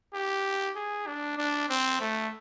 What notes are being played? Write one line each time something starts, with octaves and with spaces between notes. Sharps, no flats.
G4
G#4
D4
D4
C4
A3